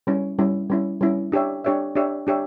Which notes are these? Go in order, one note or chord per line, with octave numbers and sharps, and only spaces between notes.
G3 C#4 E4
G3 C#4 E4
G3 C#4 E4
G3 C#4 E4
D4 G4 C#5 E5
D4 G4 C#5 E5
D4 G4 C#5 E5
D4 G4 C#5 E5